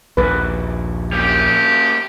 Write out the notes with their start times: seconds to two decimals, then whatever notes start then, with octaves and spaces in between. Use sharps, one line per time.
0.17 A#1 D#2 B4
1.13 A#3 C#4 G4